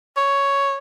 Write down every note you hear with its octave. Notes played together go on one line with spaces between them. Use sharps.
C#5